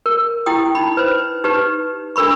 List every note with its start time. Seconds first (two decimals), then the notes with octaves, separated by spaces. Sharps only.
0.06 A#4
0.46 E4 G4 G5 D#6
0.75 D#4 B5
0.97 B4 C5
1.44 D#4 G4 B4
2.16 D4 A4 A#4 B5 C#6